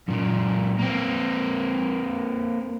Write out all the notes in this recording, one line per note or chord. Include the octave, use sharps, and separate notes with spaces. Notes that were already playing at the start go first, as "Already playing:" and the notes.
F#2 A#2
A#3 C4